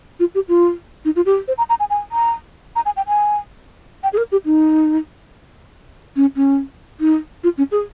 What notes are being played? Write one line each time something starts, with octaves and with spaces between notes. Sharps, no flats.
F4
G4
F4
D#4
F4
G4
C5
A#5
A#5
G#5
G#5
A#5
A#5
G#5
G5
G#5
G5
G#4
A#4
G4
D#4
C#4
C#4
D#4
F4
C#4
G#4